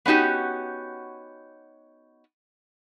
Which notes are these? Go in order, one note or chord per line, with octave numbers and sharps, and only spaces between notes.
B3 C#4 D#4 F#4 G4